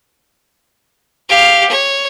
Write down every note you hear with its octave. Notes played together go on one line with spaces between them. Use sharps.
G4 F5
C#5